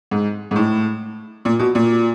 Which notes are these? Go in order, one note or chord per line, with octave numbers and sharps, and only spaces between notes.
G#2
G#2
A2
A#2
B2
A#2